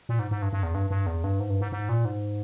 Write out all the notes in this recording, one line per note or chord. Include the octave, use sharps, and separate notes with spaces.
A#2
G#2
G#2
G2
G2
E2
G2
G2
E2
G2
G#2
G2
G#2
G#2
A#2
G#2